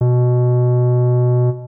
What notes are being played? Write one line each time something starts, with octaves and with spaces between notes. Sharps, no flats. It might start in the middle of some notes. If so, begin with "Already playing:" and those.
B2